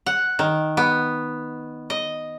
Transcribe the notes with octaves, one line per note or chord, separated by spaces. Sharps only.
F#5
D#3
B3
D#5